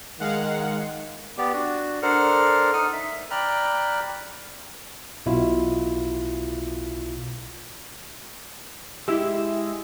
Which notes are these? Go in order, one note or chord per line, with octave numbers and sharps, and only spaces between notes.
D#3 G#3 F5 F#5
B3 G4 D5
D4 F#4
D4 A4 A#4 C5 F#5 F6
D#4 D#6 F6
E5
D5 G5 A#5 B5 F6 F#6
B1 B2 E4 F4
G#3 E4 G4 E5